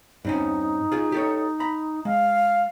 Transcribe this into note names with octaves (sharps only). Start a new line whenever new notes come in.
G2 C4 C#4 D#4
F4 G#4
G4 A4 C#5
A#5 B5
G#3 F5